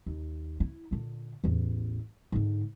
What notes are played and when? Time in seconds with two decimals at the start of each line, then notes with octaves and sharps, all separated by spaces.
0.06 D#2
0.60 E4
0.91 A#2 D3
1.44 A1 E2
2.32 G#2 D3